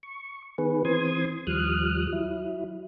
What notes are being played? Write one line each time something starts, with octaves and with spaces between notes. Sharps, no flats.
C#6
D#3 B3 G#4 B4
E3 C4 C6 D#6 G#6
D#2 F3 G3 D#6 F6 F#6
F#3 E4